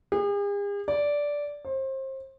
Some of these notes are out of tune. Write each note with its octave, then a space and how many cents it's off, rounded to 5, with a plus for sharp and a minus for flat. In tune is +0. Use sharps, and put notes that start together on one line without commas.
G#4 -45
D5 -10
C5 +30